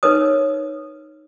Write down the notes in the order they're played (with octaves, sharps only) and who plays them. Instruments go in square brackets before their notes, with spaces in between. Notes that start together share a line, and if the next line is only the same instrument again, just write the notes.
[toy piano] D#4 A#4 B4 C#5 D#6